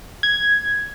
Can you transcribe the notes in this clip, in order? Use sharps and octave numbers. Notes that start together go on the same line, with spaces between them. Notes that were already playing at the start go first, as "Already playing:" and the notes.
G#6